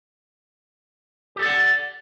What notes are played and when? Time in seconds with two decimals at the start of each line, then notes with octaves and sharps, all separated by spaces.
1.36 G4
1.39 A4
1.42 D5
1.46 F#5